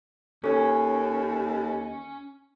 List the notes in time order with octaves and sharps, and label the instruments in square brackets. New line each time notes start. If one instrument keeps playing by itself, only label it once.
[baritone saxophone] D#2 [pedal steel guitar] C#4 [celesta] A4 C#5 G#5